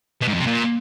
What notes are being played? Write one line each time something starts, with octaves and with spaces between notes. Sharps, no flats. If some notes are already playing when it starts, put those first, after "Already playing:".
B2
G#2
F2
C3
A#2